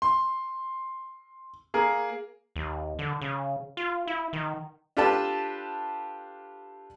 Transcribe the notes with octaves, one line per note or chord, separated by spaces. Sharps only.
C6
A#3 G#4 A#4
D#2
D3
C#3
F4
E4
D#3
D4 F4 G4 A4 B4 A5